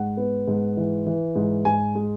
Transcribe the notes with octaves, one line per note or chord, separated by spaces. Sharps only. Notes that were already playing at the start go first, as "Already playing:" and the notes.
Already playing: G#2 F#5
B3
G#2
E3
E3
G#2
G#2 G#5
G#3